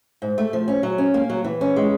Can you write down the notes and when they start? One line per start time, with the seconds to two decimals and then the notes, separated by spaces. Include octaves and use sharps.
0.22 G#2
0.38 A3
0.53 F3
0.68 C#4
0.83 F#3
0.98 C#4
1.14 A#3
1.30 F#3
1.44 E3
1.61 C#4
1.76 G#3